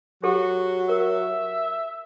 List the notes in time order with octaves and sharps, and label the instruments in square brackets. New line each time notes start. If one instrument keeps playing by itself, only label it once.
[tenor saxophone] F#3 [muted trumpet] F#4 [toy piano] G4 A4
[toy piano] A#4 [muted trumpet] E5